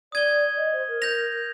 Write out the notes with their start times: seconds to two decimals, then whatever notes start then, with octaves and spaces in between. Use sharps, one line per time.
0.12 D5 D#6 G#6 D#7 G7
0.57 D#5
0.73 C5
0.88 A#4
1.02 G6 A#6 F7